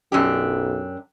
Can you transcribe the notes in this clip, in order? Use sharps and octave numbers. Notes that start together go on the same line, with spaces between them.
B1 F#2 D4 G4